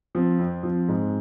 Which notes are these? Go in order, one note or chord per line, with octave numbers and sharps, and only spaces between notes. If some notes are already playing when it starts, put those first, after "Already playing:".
F3 C4
F2
F3
G#2